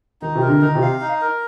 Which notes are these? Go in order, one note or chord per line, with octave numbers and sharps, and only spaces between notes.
D#3 D#4
C3
A#4
D3
D#3 D#4
C3
F5
D#4
A#4